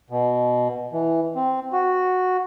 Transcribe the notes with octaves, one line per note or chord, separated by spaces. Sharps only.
B2
E3
C4
F#4